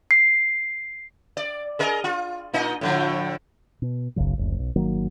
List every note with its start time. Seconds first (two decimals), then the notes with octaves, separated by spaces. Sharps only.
0.11 C7
1.37 D5
1.79 G#4 A#4 D#5
2.04 F4
2.53 A#2 D#4 D#5
2.81 A2 D3 F3
3.82 B2
4.16 F#1 B1 C#3 F#3
4.38 F#1 D2
4.59 B1
4.76 G1 D#3 F#3 A#3